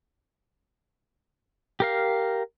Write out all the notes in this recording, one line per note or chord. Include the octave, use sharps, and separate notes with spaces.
G4 A#4 F5